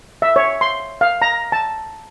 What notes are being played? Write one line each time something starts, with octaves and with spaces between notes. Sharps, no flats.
E5
C#5
C6
F5
A#5
A5